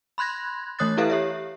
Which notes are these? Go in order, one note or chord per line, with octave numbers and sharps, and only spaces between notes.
B5 C6 F#6 G#6 A#6
E3 A3 C#5 D#6 F#6 A6
E4 G4 A4 B4 E5 F5
G4 C#5 E5